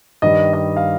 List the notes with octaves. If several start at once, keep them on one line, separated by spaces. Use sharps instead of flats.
G2 D#3 G3 D#5
D#5
F5